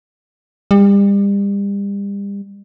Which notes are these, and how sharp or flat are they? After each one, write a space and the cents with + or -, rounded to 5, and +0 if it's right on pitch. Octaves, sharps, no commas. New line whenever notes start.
G3 +35